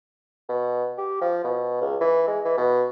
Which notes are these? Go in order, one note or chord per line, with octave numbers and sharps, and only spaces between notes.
B2
G4
F3
B2
C#2
E3
G#3
E3
B2